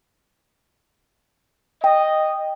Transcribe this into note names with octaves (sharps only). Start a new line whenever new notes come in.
D#5 G5